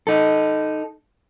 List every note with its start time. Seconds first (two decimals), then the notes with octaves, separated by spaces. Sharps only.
0.07 D#4 A4